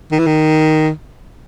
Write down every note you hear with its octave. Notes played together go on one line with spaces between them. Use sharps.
D#3
E3
D#3